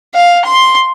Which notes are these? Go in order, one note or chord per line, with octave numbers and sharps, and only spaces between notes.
F5
C6